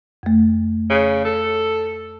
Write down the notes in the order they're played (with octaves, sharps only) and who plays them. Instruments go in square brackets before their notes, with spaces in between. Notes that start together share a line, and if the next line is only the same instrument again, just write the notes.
[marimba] F2 A3
[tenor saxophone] C#3
A4